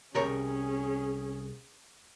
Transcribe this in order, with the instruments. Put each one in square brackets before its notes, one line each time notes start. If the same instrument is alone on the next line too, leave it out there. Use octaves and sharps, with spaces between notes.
[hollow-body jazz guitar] C2 A#4 C#5 [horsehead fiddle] C#4 G#4